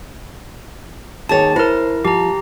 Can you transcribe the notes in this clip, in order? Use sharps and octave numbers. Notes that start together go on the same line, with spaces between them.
D#2 G#4 C#5 A5 A6
E4 A#4 C5
F3 G4 A#5